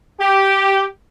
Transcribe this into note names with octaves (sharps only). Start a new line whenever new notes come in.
G4